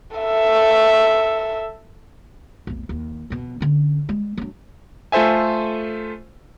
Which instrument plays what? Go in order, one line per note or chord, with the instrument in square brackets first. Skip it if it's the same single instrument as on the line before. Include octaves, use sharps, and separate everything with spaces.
[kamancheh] A4 E5
[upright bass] F1 B1
D#2
F2 B2
D3 C#4
G3 G#3
F#3 D4
[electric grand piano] A3 F4 A4 C5 E5 G#5